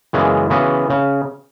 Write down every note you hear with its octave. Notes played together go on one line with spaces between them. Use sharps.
F#2 C#3 E3 G#3 B3
C#3 E3 B3 F#4 B4
C#3